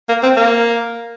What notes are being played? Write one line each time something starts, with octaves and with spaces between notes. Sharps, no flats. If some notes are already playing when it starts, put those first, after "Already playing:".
A#3
C4
A#3